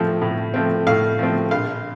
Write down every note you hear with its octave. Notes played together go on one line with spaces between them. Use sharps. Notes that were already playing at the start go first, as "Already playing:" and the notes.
Already playing: A2 F3 A3 C4
A2
F3 A3 C4
A2 F5
F3 A3 C4
A#1 F5